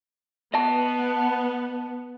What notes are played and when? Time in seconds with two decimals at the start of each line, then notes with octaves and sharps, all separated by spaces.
0.54 B3 D#5 A5